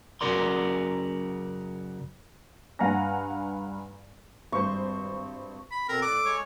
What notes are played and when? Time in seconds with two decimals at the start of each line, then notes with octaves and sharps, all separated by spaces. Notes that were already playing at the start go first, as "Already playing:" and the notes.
0.21 F#2 C#3 F#4 A#4 D5 C6
2.79 G2 F5 F#5 G#5 A#5 A#6
4.52 G#1 G2 C5 C#6
5.71 B5
5.89 B2 C4 A4 A#4
6.02 A2 D5 D6 F#6
6.25 G#3 C#5 C#6